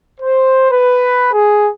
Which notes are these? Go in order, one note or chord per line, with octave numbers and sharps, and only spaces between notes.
C5
B4
G#4